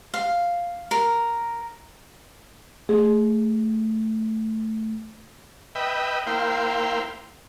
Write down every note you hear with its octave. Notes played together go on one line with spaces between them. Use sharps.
F5
A#4
A3 G#4
B4 D#5 E5 G5
A#3 E4 C5 F5 G5